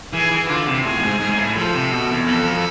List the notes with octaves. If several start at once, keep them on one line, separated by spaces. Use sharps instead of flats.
E3 G#4
E3
D3 F4
C3
A2 G#4
F2
G#2
G#2
A2
F3 A4
C3
B2
E2
F2 A4